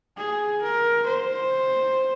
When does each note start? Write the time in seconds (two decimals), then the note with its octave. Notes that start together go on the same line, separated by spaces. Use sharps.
0.17 G#4
0.62 A#4
1.06 C5